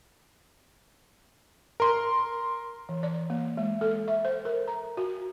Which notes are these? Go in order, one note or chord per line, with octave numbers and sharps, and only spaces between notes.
A#4 C6
E3
D5
A#3
G#3
A4
E5
C5
A#4
A#5
F#4